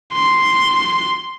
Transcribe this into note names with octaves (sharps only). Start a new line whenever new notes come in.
C6